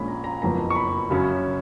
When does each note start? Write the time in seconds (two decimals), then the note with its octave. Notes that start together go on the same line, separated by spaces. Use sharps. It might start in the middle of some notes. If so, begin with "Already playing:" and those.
Already playing: A#1 A#2 G#3 C#4 B5
0.08 A#5
0.24 A#5
0.42 F#1 F2 F3 B3 A#5
0.70 C#6
0.76 B5
1.10 F#2 C#3 F#3 C#4